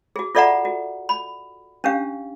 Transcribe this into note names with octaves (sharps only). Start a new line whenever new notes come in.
F#4 G#4
F4 A4 D5 E5 F#5 A#5
F#4
B5
C#4 D4 G4 F5